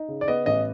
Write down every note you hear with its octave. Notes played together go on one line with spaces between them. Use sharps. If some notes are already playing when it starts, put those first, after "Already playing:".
Already playing: D#4
C#3
D5
B3 D#5
A1 D#5